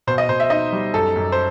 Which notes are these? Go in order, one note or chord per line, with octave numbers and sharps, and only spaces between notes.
B2 C5
D#5
B2 C5
E5
D#4 D#5
G3
F#2 A4
F#2
C5